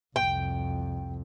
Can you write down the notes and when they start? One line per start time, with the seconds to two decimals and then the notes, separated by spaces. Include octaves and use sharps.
0.16 C2 F2 G5